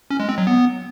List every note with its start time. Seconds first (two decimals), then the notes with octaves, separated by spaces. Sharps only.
0.10 C#4
0.20 G#3
0.29 C4
0.38 F#3
0.47 B3